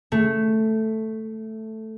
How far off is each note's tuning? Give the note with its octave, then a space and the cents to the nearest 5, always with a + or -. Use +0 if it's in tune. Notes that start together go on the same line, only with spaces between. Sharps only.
A3 +0